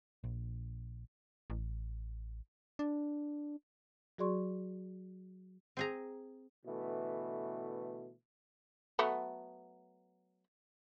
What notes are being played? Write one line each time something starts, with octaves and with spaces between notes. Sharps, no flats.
A#1
A1
D4
F#3 F#4 G#4 D5 C6 C#6
C4 G#4 A#5
B2 D3 E3 A3
F#3 A3 B3